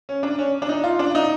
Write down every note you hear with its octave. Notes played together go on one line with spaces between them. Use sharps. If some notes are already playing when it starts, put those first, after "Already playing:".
C#4
D4
C#4
D4
D#4
F4
D4
D#4